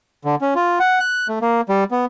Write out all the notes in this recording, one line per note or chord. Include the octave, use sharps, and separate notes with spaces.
D3
C#4
F4
F#5
F#6
A3
A#3
G3
B3